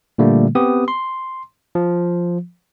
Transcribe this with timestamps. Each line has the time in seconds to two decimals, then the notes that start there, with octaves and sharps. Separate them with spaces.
0.18 A#2 D3 G3 A3 A#3
0.55 B3 C4 G4 B4 D#6
0.88 C6
1.75 F3